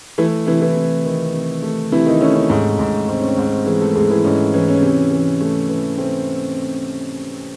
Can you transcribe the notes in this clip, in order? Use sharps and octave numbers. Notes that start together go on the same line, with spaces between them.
E3 A3 E4
C3 E3 E4
E3 E4
C3
D#3
C3
A3
C3 E3 E4
D#3 D#4
A3 C#4
C#4
G#2
G#2
G#2 C4
C#4
C4
G#2
C#4
E3 G#3 G#4
A3 A4
G#2 G#3 G#4
E3 E4
G#2 C#4
E3 C#4
C#4
C3
E3
A3
E3
A3 C4